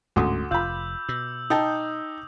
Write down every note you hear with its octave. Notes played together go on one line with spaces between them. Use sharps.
D1 D2 G#2 C#4 C6 D6 D#6
F1 F4 B5 E6 G6
B2 E6
D#4 G5 A5 D#6